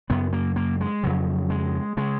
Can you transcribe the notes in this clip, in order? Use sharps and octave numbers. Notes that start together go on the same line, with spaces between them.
F#2 C#3 B3
A#3
A#3
G#3
F2 C#3 F#3
G#3
C#3 G#3